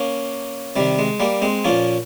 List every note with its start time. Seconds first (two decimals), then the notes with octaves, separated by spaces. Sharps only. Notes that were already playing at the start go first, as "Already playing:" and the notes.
Already playing: A#3 C#4
0.76 C3 D#3 G3
0.98 G#3
1.20 G3 A#3
1.42 G#3 C4
1.64 A#2 F3 A#3 C#4